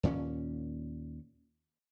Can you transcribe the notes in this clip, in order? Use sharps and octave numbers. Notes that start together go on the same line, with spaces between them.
D#2 A#2 A3 C#4